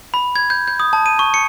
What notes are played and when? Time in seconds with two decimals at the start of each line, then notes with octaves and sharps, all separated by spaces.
0.14 B5
0.36 G#6
0.50 G6
0.68 G6
0.80 D#6
0.93 A5
1.06 D#7
1.19 C#6
1.34 C#7